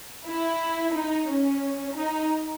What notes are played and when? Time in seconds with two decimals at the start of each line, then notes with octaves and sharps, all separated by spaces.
0.27 E4
0.94 D#4
1.28 C#4
1.95 D#4